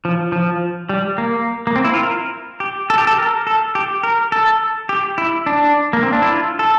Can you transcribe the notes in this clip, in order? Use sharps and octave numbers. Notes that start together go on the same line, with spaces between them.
F3
F3
G3
A#3
A#3
C4
E4
F4
A#4
G4
A4
G4
A4
A#4
A4
G4
A#4
A4
G4
E4
D4
A#3
C4
D4
E4
F4
A4